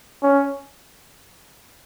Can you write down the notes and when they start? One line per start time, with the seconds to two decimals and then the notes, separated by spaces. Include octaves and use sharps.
0.23 C#4